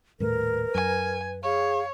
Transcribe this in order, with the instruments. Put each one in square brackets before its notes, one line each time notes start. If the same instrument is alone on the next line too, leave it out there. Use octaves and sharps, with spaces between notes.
[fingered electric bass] D#1 A2 A3 [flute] A#4 [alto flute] B4
[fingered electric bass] F#2 [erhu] G#5
[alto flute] G#4 [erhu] C#5 [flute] F5